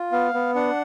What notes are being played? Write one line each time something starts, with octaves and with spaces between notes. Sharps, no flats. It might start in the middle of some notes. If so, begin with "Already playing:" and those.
Already playing: F4
B3 F5
B3
D4 F#5